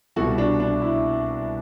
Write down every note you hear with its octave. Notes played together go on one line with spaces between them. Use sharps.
C2 B2 G3 F#4 A4
D4 F#4
D4
E4